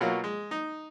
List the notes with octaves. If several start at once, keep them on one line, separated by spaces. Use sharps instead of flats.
B2 F#3 A#3 F4
G#3
D#4